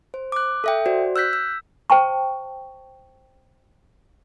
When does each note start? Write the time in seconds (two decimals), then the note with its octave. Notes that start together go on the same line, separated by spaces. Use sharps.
0.14 C5
0.32 D6 F#6
0.64 A4 E5 G5
0.85 F#4 C5 D5
1.16 E6 F#6 G6 B6
1.33 E6
1.90 C5 G5 A5 C#6